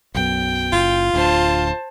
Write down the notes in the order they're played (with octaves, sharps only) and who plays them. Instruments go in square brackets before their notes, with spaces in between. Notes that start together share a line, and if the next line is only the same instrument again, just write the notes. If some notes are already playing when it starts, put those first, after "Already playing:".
[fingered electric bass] B1 F#2 B2 [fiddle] G5
[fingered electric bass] F#1 [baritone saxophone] F4
[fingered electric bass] D1 D2 D4 [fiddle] C5 A5